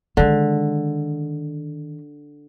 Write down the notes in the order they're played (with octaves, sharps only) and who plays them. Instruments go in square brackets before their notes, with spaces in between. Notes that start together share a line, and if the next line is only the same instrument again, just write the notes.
[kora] D3 [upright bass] D#3 G#3